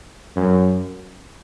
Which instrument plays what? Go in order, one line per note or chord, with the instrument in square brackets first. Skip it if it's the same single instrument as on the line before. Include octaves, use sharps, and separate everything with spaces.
[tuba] F#2